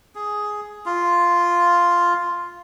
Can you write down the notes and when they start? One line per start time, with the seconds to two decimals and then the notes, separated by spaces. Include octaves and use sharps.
0.15 G#4
0.86 F4